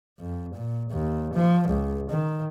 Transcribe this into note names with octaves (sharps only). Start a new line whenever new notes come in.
F2
A#2
D#2
F3
C#2
D#3